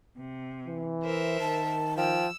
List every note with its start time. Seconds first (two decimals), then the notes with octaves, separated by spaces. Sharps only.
0.17 C3
0.67 E3
1.02 A#4 C5 E5
1.40 D#3 A5
1.97 F3 G5 E6